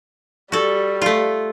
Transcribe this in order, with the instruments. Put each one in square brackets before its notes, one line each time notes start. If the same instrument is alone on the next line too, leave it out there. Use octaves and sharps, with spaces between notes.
[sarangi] G3 [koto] F#4 A4
[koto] A3 F4